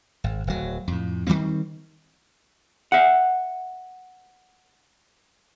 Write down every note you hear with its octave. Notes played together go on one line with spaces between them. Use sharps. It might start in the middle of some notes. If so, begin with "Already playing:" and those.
G#1
D1 F#3
F2 A2
D#3 F3 G3 C4
E5 F#5